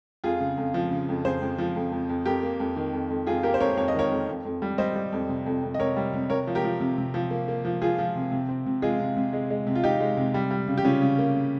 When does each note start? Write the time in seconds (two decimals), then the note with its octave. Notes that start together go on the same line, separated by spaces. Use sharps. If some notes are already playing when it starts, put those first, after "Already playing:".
0.24 F2 F4 G#4
0.40 C#3
0.57 F2
0.74 F3
0.91 C#3
1.09 F2
1.25 F2 G#4 C5
1.42 F2
1.58 F3
1.76 F2
1.92 F2
2.09 F2
2.25 F2 G4 A#4
2.43 A#3
2.60 F2
2.76 D#3
2.93 F2
3.10 F2
3.27 F2 F4 G#4
3.43 A#3 G4 A#4
3.54 C5
3.60 F2 A#4 C#5
3.77 F2 C#5
3.88 D#5
3.95 D#3 A#4 C#5
4.11 F2
4.28 F2
4.45 F2
4.62 G3
4.78 G3 C5 D#5
4.95 G3
5.13 F2
5.29 C3
5.46 F2
5.62 F2
5.74 D#5
5.79 C3 A#4 C#5
5.97 G3
6.13 C3
6.30 C3 A#4 C#5
6.47 F3
6.55 G4 A#4
6.64 F3
6.80 C3
6.98 C3
7.14 F3
7.31 A#3
7.48 A#3
7.65 F3
7.81 F3 F4 G#4
7.98 F3
8.15 C3
8.32 C3
8.49 C4
8.66 C3
8.82 G#3 F4 G#4
8.99 C3
9.17 C3
9.33 G#3
9.50 G#3
9.67 C3
9.75 F4
9.84 C3 D#4 G4
10.00 G#3
10.17 C3
10.34 G3
10.51 G3
10.68 C#3
10.77 G4
10.84 C#3 C#4 F4
11.02 C#3
11.18 A#3
11.35 C#3